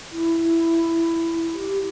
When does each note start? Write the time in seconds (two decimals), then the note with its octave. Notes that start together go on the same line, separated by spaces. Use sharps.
0.13 E4
1.53 G4